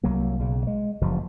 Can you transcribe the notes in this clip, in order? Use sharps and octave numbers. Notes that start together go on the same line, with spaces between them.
C2 F#3 A#3
B1 C#3
G#3
F#1 G2 F3